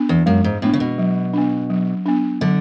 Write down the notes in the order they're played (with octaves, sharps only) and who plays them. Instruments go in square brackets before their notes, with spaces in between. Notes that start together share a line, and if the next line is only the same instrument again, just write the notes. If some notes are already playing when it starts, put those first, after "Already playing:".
Already playing: [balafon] B3 D4
[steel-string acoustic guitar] E2
[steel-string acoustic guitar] F#2 [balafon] G#3
[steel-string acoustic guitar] G#2
[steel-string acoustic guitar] A2 [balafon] B3 D4
[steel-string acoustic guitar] C#3
B2
[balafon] F#3
B3 D4
F#3
B3 D4
[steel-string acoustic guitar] D3 [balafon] F#3